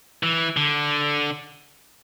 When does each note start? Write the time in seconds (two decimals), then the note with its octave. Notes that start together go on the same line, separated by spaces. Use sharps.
0.23 E3
0.57 D3